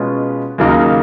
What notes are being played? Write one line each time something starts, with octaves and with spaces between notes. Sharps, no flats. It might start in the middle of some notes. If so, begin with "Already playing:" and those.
Already playing: B2 G#3 C#4 F4 B4
D#2 C#3 F#3 A#3 D#4